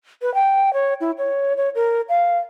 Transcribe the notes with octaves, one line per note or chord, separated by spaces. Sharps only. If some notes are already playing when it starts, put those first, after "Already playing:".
B4
G5
C#5
E4
C#5
C#5
A#4
F5